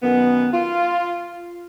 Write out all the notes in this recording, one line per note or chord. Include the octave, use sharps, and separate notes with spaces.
F#2 D#3 B3
F4